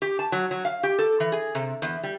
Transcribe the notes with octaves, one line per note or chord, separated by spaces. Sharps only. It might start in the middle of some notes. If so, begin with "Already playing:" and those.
G4
A5
F#3
F#3
F5
G4
A4
E3
G#4
C3
E2
G3